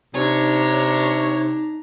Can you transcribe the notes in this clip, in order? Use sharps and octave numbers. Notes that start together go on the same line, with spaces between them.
C3 D4 D#4 C#5 A#5